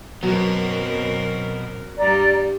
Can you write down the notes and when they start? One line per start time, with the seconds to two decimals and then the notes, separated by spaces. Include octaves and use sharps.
0.23 F#2 B2 F#3 B3 C4 A#4
1.99 G2 G3 D5 A#5